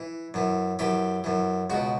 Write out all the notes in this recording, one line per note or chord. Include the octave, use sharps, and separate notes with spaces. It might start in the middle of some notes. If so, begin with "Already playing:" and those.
Already playing: E3
F#2 E3
F#2 E3 G4
F#2 E3
C#2 B2 F#4